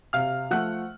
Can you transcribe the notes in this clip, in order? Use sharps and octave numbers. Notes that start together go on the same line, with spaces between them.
C3 F5 F6
F3 A3 F#5 F#6